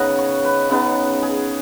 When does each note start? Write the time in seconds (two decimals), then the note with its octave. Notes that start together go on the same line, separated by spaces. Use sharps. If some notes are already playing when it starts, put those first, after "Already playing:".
Already playing: C#3 B3 D#4 D#5 F#5
0.18 C#5
0.44 B4
0.69 C#3 B3 D#4
1.22 G#4